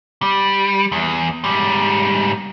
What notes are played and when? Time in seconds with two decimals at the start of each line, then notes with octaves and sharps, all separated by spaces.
0.22 G3
0.92 E2
1.44 G#2 G3